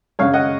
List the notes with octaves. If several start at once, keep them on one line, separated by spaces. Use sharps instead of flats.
F#2 C#3 C#5 F5
D#5 F#5